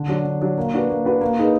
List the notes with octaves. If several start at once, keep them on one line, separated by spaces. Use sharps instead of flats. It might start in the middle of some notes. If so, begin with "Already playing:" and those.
Already playing: D3
F#3 D4
D3
F#3 D4
A#3
D4 F#4 B4
A#3
D4 F#4 B4
A#3
D#4 G#4 B4